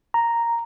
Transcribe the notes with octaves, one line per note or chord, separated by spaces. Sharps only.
A#5